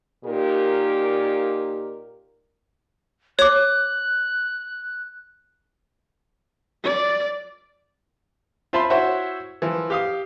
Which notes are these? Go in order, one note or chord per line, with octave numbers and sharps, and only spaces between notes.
A#2 D#4 G4 A#4
C#5 D6 F#6
D5
F4 C5 E5 A5 B5 C6
E4 F#4 C5 C#5 E5 F#5
E3 F3
G4 F5 D#6